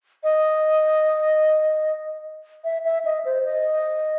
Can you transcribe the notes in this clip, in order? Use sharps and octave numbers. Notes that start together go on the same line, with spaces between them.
D#5
E5
E5
D#5
C5
D#5